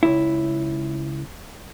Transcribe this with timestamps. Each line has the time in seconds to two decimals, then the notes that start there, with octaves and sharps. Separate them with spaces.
0.03 C#2 E4